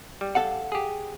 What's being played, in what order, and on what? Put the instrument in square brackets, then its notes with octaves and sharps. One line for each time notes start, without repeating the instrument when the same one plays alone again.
[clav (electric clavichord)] G3
[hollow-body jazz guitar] A4 F5 F#5
[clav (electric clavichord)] G4 G#4